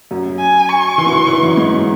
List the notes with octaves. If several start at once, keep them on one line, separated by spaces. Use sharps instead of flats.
F#2 F#3
G#5
C#6
E3
F#3
E3
E3
F#2 F#3
G#2 G#3